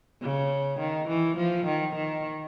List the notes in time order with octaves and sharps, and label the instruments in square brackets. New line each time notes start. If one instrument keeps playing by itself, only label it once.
[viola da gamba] C#3
D#3
E3
F3
D#3
D#3